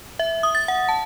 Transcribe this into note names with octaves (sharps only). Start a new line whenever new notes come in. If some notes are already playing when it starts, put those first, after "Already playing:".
E5
D#6
A6
F#5
A5